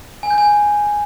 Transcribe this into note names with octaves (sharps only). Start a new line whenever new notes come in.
G#5
G6
G#5